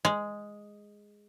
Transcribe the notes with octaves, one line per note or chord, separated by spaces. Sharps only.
G#3